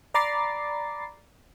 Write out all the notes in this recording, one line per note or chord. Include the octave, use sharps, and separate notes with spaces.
D5 A#5 B5 D6 A6 C7